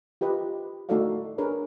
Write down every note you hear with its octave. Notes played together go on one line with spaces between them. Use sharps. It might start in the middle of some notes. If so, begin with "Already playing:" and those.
F4 G4 B4 D#5
A3 D#4 F#4 A4 D5 F5
D4 G#4 A#4 B4 C#5